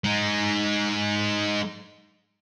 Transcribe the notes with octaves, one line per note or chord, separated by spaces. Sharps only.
G#3 D#4